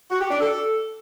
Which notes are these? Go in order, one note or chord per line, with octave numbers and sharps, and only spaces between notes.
F#4
G4
D4
A4